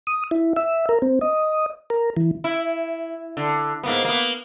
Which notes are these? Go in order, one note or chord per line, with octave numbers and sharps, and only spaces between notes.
D#6
E4
E5
A#4
C4
D#5
A#4
E3
E4
D3
G#2 A#3 B3
A#3 B3